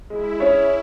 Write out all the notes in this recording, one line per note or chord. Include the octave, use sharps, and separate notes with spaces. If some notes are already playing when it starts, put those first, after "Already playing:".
G#3 E4
C#4 E4 G#4 C#5 E5